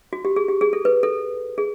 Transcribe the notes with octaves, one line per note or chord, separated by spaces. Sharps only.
F#4
G4
G#4
G4
G#4
A4
B4
A4
G#4